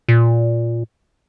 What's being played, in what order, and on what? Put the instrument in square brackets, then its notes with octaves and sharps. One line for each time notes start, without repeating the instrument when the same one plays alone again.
[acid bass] A#2